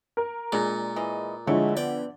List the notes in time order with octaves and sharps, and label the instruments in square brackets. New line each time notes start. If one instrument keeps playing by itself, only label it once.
[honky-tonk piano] A#4
[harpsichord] A#2 [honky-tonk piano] G#3 [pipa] D4 G#4 A#5
[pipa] E3 D#5
[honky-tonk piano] D3 F3 [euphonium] G#3 [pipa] A3 E4 C#5
[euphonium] B3 [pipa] D5 [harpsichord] G5